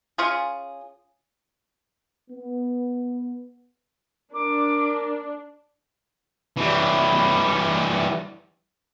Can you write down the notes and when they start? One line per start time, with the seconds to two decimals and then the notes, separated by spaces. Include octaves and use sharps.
0.18 C#4 F4 G#4
2.31 B3
4.33 D4 A#4 D6
6.57 E3 G3